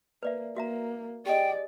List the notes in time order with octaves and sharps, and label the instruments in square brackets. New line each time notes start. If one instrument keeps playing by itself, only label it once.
[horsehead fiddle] A#3 [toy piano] B4 D5 E5
[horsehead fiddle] A#3 [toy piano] F#4 E5 A#5
[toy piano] G4 D#5 [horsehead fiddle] G#4 D5 [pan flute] G5